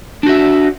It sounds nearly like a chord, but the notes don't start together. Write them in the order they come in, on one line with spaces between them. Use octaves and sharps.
D4 F#4 E5